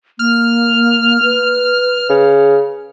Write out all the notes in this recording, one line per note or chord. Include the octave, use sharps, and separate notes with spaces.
A#3 F6
B4
C#3